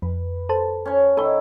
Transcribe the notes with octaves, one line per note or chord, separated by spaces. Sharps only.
F2 B4
A4 C5 A5
C#4 C#5
D#3 C#4 E4 A4 C#5